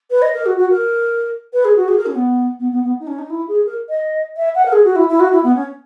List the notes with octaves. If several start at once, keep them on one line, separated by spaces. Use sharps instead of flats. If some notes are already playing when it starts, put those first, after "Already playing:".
B4
D#5
A#4
F#4
F#4
A#4
B4
G#4
F#4
G#4
A#4
C#4
B3
B3
B3
B3
D#4
C#4
D#4
E4
G#4
A#4
D#5
E5
F#5
A#4
G#4
F#4
E4
E4
F#4
E4
B3
C#4